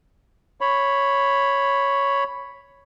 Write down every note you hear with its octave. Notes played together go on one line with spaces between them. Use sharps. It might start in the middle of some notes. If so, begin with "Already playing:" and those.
C#5 B5